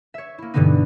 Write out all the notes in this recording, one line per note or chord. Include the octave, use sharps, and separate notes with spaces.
C#5 E5
A#3 E4
G2 B2 D3 E3 B3 D#4